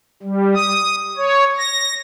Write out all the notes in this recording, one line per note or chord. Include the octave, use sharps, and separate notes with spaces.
G3
D#6
C#5
A#6